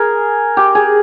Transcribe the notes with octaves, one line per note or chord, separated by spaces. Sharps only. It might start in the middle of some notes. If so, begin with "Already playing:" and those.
Already playing: G#4 A#4
G4
G#4